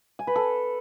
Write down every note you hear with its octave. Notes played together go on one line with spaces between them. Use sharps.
G#5
B4
A4